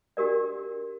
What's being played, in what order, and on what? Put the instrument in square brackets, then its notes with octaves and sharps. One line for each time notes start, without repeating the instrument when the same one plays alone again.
[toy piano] D4 F#4 G4 A#4 D5